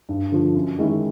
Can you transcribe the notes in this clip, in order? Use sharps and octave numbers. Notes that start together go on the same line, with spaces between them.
G2
D3 F3
F#2
D#3 G#3 C#4 E4